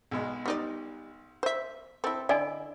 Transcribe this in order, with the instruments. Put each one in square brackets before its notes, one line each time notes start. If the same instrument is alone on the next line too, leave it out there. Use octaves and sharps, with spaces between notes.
[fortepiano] B1 B2 G#3
[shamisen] G3 D#4 D5
C5 E5
[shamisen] C4 E4 [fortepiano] A4
[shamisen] D3 [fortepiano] E4 [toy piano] D5 D#5 G#5